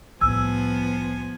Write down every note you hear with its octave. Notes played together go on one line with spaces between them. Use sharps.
C2 A2 F3 B3 G#5 E6